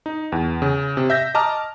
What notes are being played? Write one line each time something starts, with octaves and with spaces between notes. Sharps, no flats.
D#4
E2
C#3
C3
E5 G6 A#6
D#5 A5 A#5 D6 F6